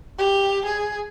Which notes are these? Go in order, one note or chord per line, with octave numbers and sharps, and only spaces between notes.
G4
G#4